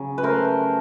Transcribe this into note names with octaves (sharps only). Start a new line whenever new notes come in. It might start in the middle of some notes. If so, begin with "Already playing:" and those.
Already playing: C#3 F#3
B4
A3 A#4 C5